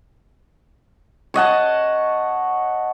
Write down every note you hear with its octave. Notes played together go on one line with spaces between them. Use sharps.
C#5 D#5 F#5 A5